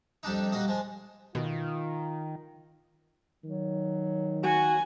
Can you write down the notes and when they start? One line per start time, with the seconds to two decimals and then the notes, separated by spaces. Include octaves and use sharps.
0.23 F2 G3 D4 D#4
0.52 G3 A#3 F#4 D#5
0.68 F3 G#3
1.35 B2 D#3 F4
3.44 D#3 F#3
4.44 F#4 G#5